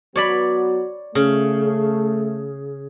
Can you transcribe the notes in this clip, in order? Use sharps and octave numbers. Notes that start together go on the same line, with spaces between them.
F#3 B3 F#4 C#5 D5 B5
C#3 A3